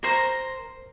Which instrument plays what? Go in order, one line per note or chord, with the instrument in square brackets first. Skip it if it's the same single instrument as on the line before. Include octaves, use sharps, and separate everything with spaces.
[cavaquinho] A#4 C5 A#5